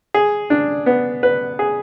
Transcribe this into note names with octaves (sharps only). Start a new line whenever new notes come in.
G#4
D4
B3
B4
G#4